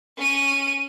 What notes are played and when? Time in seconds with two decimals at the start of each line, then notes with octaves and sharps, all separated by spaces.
0.18 C#4 D#7